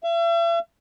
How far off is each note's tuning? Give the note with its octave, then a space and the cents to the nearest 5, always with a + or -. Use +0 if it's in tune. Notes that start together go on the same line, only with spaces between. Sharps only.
E5 +40